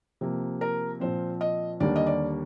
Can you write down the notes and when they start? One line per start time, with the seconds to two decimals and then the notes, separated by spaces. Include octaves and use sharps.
0.21 C3 F3 A#3
0.61 A#4
1.00 A#2 F3 C4 C5
1.41 D#5
1.80 D#2 D3 G3 A#3 D4 D5
1.96 D#5
2.07 D5